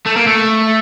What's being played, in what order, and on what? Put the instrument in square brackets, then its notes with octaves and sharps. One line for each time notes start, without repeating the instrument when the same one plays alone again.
[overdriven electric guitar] A3
A#3
A3